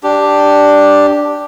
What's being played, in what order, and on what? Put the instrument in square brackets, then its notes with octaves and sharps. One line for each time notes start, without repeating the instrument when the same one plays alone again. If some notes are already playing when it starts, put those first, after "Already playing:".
[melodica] D4 G4